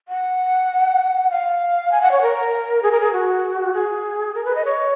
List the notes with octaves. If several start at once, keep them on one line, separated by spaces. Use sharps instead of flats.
F#5
F5
G#5
F#5
C#5
A#4
G#4
A#4
G#4
F#4
G#4
A#4
B4
D#5
C#5